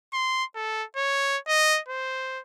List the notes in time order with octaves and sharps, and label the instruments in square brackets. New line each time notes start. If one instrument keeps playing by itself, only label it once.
[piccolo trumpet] C6
A4
C#5
D#5
C5